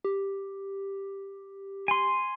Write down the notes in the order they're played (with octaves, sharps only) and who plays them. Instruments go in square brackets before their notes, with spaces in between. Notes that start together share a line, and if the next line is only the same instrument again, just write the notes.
[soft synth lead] G4
[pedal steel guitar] G#5 C6